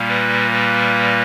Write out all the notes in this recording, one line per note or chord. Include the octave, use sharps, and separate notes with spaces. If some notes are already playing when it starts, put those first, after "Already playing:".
Already playing: A#2 G3 A#3
B4
B4